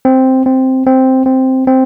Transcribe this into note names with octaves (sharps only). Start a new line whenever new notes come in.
C4
C4
C4
C4
C4